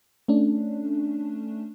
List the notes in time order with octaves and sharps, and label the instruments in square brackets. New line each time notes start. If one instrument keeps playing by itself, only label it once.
[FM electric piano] A3 C#4 D4